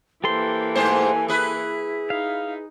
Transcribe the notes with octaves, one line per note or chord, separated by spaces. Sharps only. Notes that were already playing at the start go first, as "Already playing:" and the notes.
E3 A#3 G4 A4 C5 C6
G#2 A3 C5 G#5
E4 G#4 B4
D#4 F5